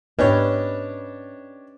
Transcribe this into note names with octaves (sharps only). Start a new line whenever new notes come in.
G#2 B3 C#4 D4 G4 B4 C#5 D#5